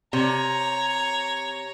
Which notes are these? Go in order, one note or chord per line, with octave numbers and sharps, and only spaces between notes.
C3 C#5 A#5